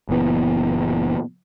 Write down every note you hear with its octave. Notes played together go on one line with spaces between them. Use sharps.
F#1 A#2 E3 B3